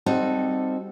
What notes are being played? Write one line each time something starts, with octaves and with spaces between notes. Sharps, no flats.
G3 C4 D#4 F#4 A4